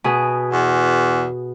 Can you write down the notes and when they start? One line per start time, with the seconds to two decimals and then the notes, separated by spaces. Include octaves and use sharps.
0.04 B2 G#4
0.52 E2